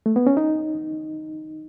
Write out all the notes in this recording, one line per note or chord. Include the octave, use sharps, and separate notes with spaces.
A3
B3
C#4
D#4